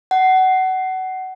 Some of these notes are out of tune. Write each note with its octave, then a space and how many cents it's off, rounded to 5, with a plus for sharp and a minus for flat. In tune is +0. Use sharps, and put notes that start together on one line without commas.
F#5 +25